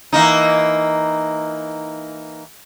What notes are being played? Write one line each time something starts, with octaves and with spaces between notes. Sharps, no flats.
E3 A#3 D#4